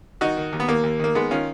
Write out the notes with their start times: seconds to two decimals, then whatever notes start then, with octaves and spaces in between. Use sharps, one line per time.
0.21 D#3 D#4 F#4
0.37 D#3
0.52 D#2
0.60 B3
0.68 D#2 A#3
0.83 D#2
0.99 D#3 A#3
1.15 D#3 G#3 B3
1.31 D#3 C#4 F4